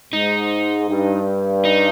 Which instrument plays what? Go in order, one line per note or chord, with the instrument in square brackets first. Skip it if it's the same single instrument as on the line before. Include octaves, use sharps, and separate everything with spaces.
[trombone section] G#2 [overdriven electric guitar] D#4
[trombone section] G2
[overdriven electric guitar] D#4